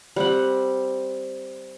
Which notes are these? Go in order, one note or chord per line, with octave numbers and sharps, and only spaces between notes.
G3 C4 F#5